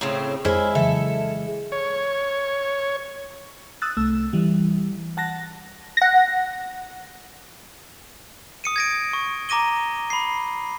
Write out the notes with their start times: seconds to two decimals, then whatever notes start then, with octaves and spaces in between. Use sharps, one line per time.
0.01 A2 C#3 C4
0.45 F2 G#3 E4 C5 C#5 E5 F6
0.75 C#3 E3 F#3 A4 E5
1.72 C#5
3.82 D#6 E6 F#6 A6
3.97 C2 A3 E6
4.33 E3 G3
5.17 F#5 A5 F#6 A#6
5.97 F#5 A#6
8.64 D#6 C#7 D#7
8.76 G#6 A#6 D7
9.13 C#6
9.49 A#5 D6 A#6 D#7 G7
10.10 B5 C7